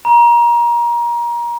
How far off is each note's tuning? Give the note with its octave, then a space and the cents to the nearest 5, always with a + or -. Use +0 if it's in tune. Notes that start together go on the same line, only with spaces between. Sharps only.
A#5 +25